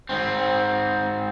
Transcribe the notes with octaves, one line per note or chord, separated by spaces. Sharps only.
G#2 C4